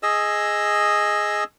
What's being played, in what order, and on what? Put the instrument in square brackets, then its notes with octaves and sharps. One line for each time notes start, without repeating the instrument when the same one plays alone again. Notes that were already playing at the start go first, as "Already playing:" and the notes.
[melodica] G#4 D#5 E6